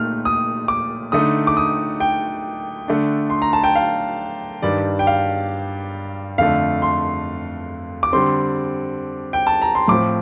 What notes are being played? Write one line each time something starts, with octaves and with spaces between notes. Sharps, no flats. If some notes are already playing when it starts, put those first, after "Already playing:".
Already playing: A#2 A3 D#4 F6
D#6
D6
D3 A3 D#4 D#6
D6
D#6
G5
D3 A3 D4
C6
A#5
A5
G5
F5
G2 D#3 G3 D5
G5
F5
F2 D3 A3 F5
C6
D6
D3 G3 C4 C6
G5
A5
A#5
C6
A2 F3 C4 D6